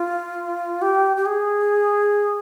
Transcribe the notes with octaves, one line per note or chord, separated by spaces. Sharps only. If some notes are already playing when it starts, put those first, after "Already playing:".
Already playing: F4
G4
G4
G#4